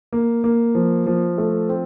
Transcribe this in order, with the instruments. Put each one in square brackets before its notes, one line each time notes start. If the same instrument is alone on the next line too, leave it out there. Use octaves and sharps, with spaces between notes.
[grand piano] A#3
A#3
F3
F3
A3
C4